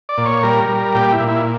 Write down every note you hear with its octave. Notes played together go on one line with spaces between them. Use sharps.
D5
A#2
C#5
G3 A#4
G3
A#2 G4
E4
A#2
E4